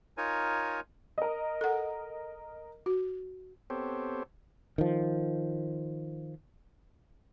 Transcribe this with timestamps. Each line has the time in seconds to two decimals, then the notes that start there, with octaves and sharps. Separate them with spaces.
0.17 D#4 F4 A#4 C#5 G#5
1.18 A#4 D#5
1.61 A4 F#5
2.86 F#4
3.70 B3 C4 G4 A4 C5 C#5
4.78 D#3 F3